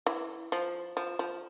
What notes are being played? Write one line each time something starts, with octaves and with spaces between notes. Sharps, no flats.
E3
F3
F3
F3